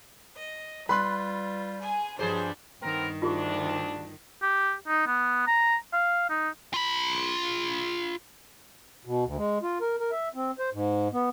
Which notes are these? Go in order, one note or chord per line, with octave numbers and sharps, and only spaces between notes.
D#5
G3 F4 B4 B5 C6 F#6
G#4 G#5
G2 F3 G3 D4 G#4 C5
G2 D#3 B3 C4 A#4
D2 D4 F4 G4 G#4
G4
D#4
B3
A#5
F5
D#4
F4 B5
B2
D2
G#3
F4
A#4
A#4
E5
C4
C5
G#2
B3